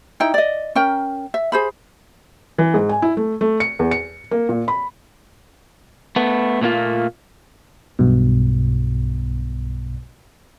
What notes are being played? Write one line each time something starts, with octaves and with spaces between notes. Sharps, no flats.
D#4 E4 G5
D5 D#5
C#4 A#4 G5
E5
G#4 C5 B5
E3
G#2
G#5
E4
A3
A3
C#7
E2
C#7
A#3
A#2
B5
A3 B3
A#2 A3 A#3 F4
B1 G2 B2